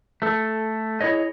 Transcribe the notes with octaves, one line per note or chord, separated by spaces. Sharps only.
A3 A4
E4 G#4 C#5 D#5